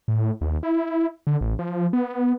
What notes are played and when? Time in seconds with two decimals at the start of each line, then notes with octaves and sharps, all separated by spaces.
0.08 A2
0.41 D#2
0.63 E4
1.27 D3
1.41 A1
1.59 F3
1.93 B3